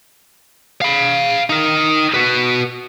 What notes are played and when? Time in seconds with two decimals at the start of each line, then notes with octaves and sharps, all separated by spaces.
0.82 F5 B5
1.50 D#4 A#4
2.14 F#4 B4